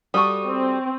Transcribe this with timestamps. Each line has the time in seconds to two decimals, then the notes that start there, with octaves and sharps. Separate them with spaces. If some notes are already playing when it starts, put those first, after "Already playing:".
0.14 G3 F#4 A4 C#6 D#6
0.47 C4